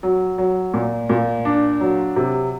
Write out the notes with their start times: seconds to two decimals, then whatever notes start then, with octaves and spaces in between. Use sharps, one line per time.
0.03 F#3
0.38 F#3
0.74 A#2
1.09 A#2
1.45 D4
1.81 F#3
2.16 C3